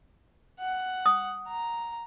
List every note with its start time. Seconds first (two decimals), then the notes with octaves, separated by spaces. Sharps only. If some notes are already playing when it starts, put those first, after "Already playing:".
0.60 F#5
1.06 D#6
1.48 A#5